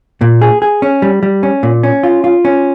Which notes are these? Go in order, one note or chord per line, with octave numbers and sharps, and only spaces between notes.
A#2
G#4
G#4
C#4
G3
G3
C#4
A#2
C#4
F4
F4
C#4